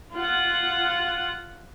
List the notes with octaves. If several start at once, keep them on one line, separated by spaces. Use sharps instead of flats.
F4 F#5